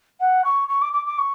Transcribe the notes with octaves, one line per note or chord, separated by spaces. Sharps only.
F#5
C#6
C#6
D6
D6
D6
C#6